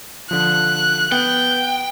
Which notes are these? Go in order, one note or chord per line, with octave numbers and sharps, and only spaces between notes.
D3 F3 F#6
B3 G5